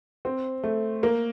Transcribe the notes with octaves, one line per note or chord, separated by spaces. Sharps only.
C4
A3
A#3